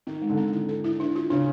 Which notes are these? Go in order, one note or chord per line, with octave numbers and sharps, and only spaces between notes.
D#3 D#4
G#3
D3
C4
E4
A4
E4
D4
F4
C#3 D4